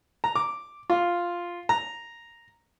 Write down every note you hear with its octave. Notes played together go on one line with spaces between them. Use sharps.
A#5
D6
F4
A#5